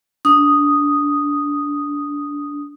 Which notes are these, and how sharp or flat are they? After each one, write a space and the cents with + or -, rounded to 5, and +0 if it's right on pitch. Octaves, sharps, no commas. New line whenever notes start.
D4 -20 D#6 +0